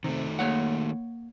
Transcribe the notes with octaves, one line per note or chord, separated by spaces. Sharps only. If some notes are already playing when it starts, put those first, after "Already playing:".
C3 D#3 A3
A#3 C#5 F#5